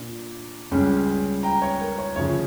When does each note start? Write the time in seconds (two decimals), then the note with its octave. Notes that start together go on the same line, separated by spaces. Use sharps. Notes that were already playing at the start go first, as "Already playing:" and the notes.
Already playing: A#2 D4
0.71 C#2 C#3 G3 C#4
1.43 G5 A#5
1.62 C#5
1.81 A#4
1.98 C#5
2.16 D2 C#5
2.19 C#3 F3